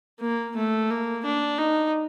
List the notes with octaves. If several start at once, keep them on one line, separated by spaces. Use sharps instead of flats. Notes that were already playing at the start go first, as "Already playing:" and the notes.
A#3
A3
A#3
D4
D#4